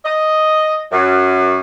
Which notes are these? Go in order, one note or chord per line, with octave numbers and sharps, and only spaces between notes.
D#5
F#2